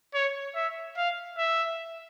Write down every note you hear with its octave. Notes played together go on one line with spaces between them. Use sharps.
C#5
E5
F5
E5